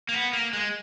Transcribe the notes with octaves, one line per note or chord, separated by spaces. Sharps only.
A#3
B3
A#3
G#3